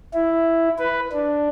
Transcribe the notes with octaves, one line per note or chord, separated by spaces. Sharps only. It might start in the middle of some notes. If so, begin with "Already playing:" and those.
E4
B4
D4